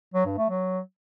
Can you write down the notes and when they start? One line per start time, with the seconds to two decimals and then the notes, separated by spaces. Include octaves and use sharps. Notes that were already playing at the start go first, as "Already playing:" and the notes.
0.14 F#3
0.26 G2
0.38 A3
0.50 F#3